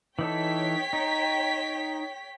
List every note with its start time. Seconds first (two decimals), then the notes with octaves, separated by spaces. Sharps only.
0.19 E3 D#4 A4 C#5 G5 B6
0.93 D#4